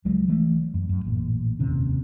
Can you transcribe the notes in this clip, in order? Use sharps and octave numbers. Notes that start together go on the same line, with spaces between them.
C#2 F#3 G#3
E3 A3
F#2
F#2
A1 A#2
F1 D#2 C3 C#4